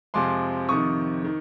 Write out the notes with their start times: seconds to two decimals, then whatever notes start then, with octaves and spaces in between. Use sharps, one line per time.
0.14 F2 C3 F3 G#3 C6 D6
0.69 F2 C3 D#3 C#6 D#6
1.24 D#3